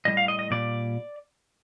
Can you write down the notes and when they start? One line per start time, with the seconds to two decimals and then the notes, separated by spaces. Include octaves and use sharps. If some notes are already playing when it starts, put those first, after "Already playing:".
0.05 A2 G3 D#5
0.17 F5
0.28 D#5
0.39 D#5
0.51 A#2 G3 D5